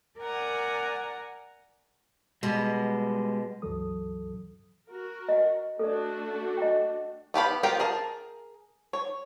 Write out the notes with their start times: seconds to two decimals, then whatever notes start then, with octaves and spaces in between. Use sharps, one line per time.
0.19 A#4 D5 F#5 G#5 A#5
2.43 B2 G3 G#3
3.62 C#2 G2 E3 F#3 A4 D#6
4.89 F#4 A#4
5.29 D#5 F#5
5.79 A3 D4 F#4 A4 D5
6.57 D#5 G5
7.34 B3 G4 F5 B5
7.63 B3 F4 G4 A#4 G5
7.80 G#4 A#4 A5
8.93 C#5